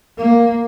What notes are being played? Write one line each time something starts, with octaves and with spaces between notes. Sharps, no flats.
A#3